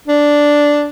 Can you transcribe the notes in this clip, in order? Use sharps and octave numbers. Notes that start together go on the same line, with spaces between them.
D4